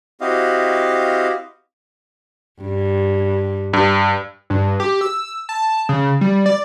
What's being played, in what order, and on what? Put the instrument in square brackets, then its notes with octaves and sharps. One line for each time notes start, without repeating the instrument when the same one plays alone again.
[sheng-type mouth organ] C4 E4 F#4 G4 D#5 F5
[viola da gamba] G2
[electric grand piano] G2
[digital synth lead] G2
G4
E6
A5
C#3
G3
D5